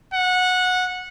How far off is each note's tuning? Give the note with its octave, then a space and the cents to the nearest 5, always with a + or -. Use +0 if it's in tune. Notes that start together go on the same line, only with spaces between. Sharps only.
F#5 -15